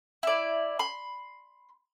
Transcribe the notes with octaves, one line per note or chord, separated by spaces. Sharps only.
E4 D5
B5 C6